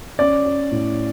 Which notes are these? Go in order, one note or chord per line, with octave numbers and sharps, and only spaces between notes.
C#4 D5
C#4
A2